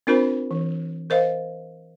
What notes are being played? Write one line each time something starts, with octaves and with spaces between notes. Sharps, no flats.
C4 D4 F4 A#4 C5 B5
E3
A#4 C5 D#5 F5